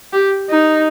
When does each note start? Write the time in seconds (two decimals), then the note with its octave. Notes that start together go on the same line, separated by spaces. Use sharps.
0.13 G4
0.50 D#4